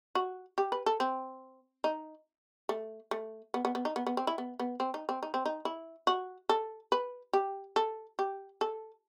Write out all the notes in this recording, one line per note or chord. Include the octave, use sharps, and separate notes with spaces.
F#4
G4
B4
A4
C4
D#4
A3
A3
B3
B3
B3
D#4
B3
B3
C4
E4
B3
B3
C4
D#4
C4
D#4
C4
D#4
E4
F#4
A4
B4
G4
A4
G4
A4